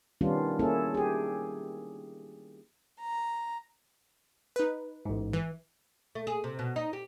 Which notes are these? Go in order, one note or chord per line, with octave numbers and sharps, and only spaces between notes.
D#3 G3 B3 C#4 D4 F4
A#3 C#4 E4 G#4 A4
G4 G#4
A#5
D#4 B4
A1 G#2
E3
A3
G#4
C3
B2
D#4
G4